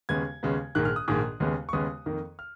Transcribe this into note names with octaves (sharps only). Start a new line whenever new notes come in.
D#2 C#3 G#3 B3 G#6
D#2 C#3 G#3 B3
A#1 G#2 D#3 A#3 F#6
F6
D#6
A#1 G#2 D#3 A#3 D#6
D#2 C#3 G#3 B3
C#6
D#2 C#3 G#3 B3 D#6
F2 D#3 A#3
F6